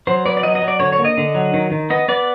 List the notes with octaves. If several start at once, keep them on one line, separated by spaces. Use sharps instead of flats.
F#3 C5
B3 D5
D5
F#3 D#5
D#5
F#3
D5
D3 C#5
C#5
A#3
D#5
D3
F#3
D#3
D#3
B3 D#5
B3 D5